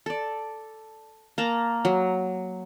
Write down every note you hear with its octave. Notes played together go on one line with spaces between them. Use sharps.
A4 D5
A#3 A5 A#5
F#3